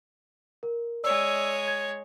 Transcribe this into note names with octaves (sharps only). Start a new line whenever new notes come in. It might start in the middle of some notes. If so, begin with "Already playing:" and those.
A#4
G#3 C#5 D5 E6
G#6